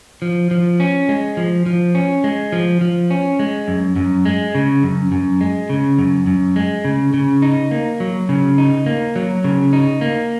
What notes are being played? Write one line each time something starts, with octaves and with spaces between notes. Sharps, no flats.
F3
F3
C#4
G#3
F3
F3
C#4
G#3
F3
F3
C#4
G#3
F#2
F#2
G#3
C#3
F#2
F#2
G#3
C#3
F#2
F#2
G#3
C#3
C#3
D#4
A#3
F#3
C#3
D#4
A#3
F#3
C#3
D#4
A#3